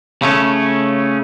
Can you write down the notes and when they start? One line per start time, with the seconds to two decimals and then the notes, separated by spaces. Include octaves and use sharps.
0.22 C#3 A3 C#4